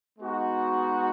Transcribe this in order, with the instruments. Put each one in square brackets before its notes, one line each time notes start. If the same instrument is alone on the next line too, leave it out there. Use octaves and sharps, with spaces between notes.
[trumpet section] G#3 B3 D#4 F#4